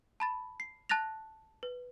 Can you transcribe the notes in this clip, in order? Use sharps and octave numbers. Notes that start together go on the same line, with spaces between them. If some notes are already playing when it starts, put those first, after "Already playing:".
A5 B5 A6
C7
A5 F#6 A6 A#6 F7
B4